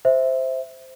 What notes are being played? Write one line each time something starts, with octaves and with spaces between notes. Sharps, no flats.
C5 E5